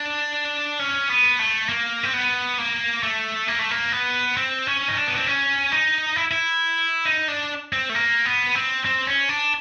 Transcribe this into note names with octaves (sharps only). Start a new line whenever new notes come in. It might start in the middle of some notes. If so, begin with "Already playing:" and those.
Already playing: D4
C#4
B3
A3
A#3
C4
B3
A#3
A3
A#3
A3
A#3
B3
C4
C#4
D#4
D4
B3
C4
C#4
D#4
E4
E4
D#4
D4
C4
A3
A#3
B3
C4
C4
C#4
D4